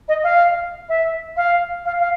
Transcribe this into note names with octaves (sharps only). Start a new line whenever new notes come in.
D#5
F5
E5
F5
F5
F5